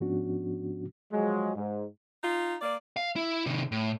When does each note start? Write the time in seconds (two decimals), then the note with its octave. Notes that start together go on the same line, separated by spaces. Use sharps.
0.01 G#2 F3 B3 C#4 D4 F#4
1.11 F3 F#3 G#3
1.55 G#2
2.22 D#4 F4
2.62 A#3 D5
2.97 F5
3.16 E4
3.46 C3 D#3
3.72 A2